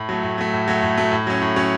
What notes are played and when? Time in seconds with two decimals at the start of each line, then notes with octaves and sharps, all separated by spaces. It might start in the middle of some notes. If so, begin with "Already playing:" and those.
Already playing: A2
0.09 F#3 A3
0.23 A2
0.38 F#3 A3
0.53 A2
0.68 F#3 A3
0.82 A2
0.97 F#3 A3
1.11 A2
1.27 F#3 C#4
1.42 A2
1.56 F#3 C#4